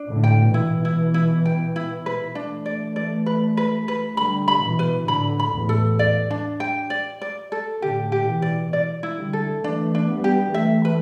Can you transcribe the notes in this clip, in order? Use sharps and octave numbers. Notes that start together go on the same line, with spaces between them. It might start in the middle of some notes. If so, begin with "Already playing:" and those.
Already playing: D4
A2 D3
G5
B2 E3 E4
E4
E4
G5
E4
B4
E3 A3 D4
D5
D5
B4
B4
B4
D3 G3 B5
B5
B2 E3
B4
A2 D3 B5
B5
E2 A2
A4
D5
D4
G5
D5
D5
A4
A2 D3 G4
G4
B2 E3
D5
D5
E4
D3 G3
A4
E3 A3 D4
D4
G3 B3
G4
E3 A3 E5
B4